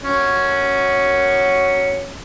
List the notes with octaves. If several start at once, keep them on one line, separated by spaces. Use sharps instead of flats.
C#4 F#4